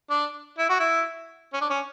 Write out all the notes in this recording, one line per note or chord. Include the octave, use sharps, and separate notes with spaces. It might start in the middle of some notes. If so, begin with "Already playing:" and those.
D4
E4
F#4
E4
C#4
D4
C#4